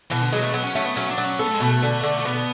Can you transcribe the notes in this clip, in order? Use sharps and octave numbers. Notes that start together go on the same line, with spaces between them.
B2 E3
D3
F#3 G#3
A3
F#3 B3
C#4
A3 C#4
B3
F#3 C#4
D4
F#3
C#4
B3 A4
A3
G#3
B2 A3
D3
D3
A3
B2 B3